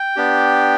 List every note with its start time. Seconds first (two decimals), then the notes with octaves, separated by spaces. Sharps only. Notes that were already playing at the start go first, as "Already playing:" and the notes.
Already playing: G5
0.16 B3 D4 G4